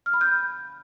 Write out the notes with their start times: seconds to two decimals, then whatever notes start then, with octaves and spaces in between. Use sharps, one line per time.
0.06 F6
0.14 B5
0.21 G6